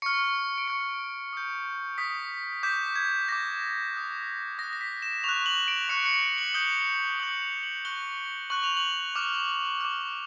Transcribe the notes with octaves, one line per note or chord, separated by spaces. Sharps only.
C#6 F6 C#7
D7
C#6 F6 C#7
D#6 G6
D#6 G6 B6
D6 G6 B6
G#6
D6 G6 A#6
D#6 F#6
D#6 F#6 A#6
A#6
B6
E7
C#6 F#6 F7
F#7
D7
C#6 F#6 C#7
C#7
D7
F#7
D#6 G6 G7
G7
D#6 G6 F#7
F7
F#7
C#6 F#6 G7
C#6 F#6 F#7
F7
F#7
D6 F6
D6 F6